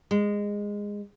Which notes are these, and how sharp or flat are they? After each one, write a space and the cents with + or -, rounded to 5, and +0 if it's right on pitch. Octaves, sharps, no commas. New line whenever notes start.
G#3 -15